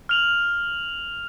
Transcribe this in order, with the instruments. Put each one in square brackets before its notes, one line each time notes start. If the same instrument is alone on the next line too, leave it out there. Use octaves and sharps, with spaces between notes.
[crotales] F6 F7 F#7